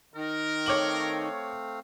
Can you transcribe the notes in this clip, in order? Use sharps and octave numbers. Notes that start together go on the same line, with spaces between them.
D#3 A#4
A3 C4 C#5 F5 D6 F#7